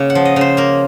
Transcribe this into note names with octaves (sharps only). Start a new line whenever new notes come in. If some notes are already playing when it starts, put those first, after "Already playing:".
Already playing: C#3 A#3 C#5
F#5
F3
D#5
C#3 C5
A#3 A#4